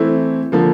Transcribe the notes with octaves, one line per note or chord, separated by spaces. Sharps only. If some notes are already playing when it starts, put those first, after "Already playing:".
Already playing: E3 A3 C4 E4
D3 F3 A#3